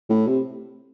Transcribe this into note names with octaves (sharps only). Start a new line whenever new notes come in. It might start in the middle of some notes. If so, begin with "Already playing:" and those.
A2
C3